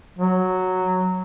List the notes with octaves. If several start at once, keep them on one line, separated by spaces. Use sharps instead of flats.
F#3